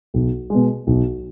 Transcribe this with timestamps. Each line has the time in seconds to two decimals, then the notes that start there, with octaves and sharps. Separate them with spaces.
0.14 B1
0.50 B2 G#3
0.87 B1